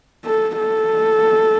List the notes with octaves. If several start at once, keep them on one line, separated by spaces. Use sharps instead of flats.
A4
A4